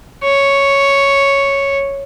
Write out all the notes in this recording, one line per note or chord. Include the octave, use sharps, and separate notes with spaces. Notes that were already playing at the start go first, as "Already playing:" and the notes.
C#5